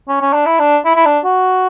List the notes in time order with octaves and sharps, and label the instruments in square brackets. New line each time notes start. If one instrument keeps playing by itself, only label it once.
[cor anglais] C#4
C#4
D4
E4
D4
E4
E4
D4
F#4